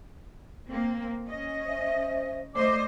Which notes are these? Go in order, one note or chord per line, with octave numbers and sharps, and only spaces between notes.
A#3 C4
C#4 D#5
C5 E5
A3 C5 D5 D#5 D6